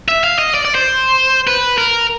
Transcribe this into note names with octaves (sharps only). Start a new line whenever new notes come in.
E5
F5
D#5
D5
D5
C5
B4
A#4